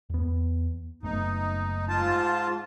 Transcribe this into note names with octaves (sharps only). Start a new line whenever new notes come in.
E2 B3
F#1 A3 B3 D#4
G#2 F4 A5